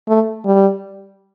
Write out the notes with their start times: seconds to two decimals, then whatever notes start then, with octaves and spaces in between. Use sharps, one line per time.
0.08 A3
0.45 G3